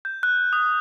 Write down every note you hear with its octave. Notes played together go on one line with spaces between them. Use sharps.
G6
F#6
D#6